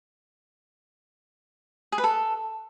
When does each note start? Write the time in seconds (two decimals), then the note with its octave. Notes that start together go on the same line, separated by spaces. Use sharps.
1.92 G#4
1.98 B4
2.04 A4